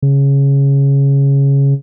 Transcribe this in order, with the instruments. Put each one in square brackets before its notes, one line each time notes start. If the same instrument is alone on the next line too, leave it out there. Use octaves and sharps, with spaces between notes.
[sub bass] C#3